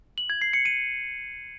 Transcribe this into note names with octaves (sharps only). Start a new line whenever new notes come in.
F#7
G#6
C7
C#7
D#7